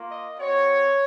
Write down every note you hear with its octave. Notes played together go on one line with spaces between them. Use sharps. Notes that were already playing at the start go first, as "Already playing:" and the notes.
Already playing: A#3 F4
D#5
C4 F#4 C#5